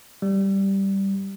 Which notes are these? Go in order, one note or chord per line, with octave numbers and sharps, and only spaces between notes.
G3